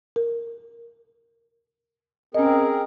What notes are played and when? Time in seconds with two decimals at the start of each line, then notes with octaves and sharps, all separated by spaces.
0.16 A#4
2.34 C4 C#4 G#4 A#4 D#5